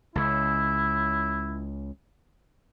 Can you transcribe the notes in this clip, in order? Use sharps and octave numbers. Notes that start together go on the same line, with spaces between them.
C#2 C#3 E4